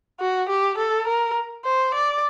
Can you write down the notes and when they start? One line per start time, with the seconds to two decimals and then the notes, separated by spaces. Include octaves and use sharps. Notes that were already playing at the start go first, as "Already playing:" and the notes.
0.20 F#4
0.49 G4
0.78 A4
1.07 A#4
1.65 C5
1.94 D5